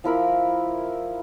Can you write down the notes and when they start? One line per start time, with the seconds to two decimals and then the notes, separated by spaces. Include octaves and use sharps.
0.04 F3 E4 A#4 B5